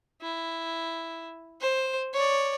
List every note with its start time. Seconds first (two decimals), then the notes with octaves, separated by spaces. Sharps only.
0.22 E4
1.61 C5
2.13 C#5 D5